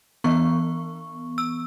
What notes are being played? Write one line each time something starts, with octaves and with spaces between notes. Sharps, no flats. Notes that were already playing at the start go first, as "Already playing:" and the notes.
E3 B3 C#6
E6